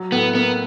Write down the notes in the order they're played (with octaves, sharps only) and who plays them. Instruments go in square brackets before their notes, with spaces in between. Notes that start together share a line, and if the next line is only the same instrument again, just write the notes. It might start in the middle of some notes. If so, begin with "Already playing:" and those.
Already playing: [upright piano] F#3
[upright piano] A2 [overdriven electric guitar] B3
[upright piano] A#3 [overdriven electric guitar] B3